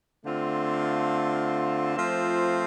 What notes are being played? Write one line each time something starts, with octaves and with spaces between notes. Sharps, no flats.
D3 A3 C4 F4
F3 A3 C4 F4